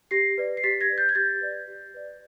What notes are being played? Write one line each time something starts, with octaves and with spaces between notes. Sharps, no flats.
G4 A#6 C7
B4 D5
C7
G4 A6 B6
G#6 A#6
B4 D5
G6 A6
G#6
G4 G6 A6
B4 D5
G4
B4 D5